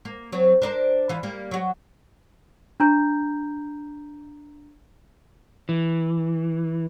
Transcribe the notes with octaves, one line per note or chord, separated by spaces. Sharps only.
A#3
F#3 C4
D4 A#4 C5
E3 F4
G3 A#3
F#3 F#4
D4 A#5 G6
E3